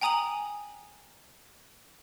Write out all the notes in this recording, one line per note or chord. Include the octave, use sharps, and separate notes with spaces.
G5 G#5 A#5 D#6 D#7 F#7